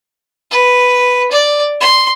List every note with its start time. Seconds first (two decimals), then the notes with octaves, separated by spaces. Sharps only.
0.51 B4
1.31 D5
1.81 C6